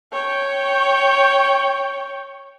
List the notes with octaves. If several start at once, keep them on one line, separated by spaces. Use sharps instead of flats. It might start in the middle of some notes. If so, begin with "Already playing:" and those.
C#5 G5